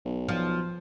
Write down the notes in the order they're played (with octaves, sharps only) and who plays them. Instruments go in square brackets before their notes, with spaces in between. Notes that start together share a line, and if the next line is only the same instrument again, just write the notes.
[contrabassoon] B1
[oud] F3